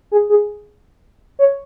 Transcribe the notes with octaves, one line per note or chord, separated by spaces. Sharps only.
G#4
G#4
C#5